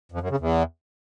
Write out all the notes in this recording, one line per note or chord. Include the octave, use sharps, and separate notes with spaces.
F2
F#2
C#3
E2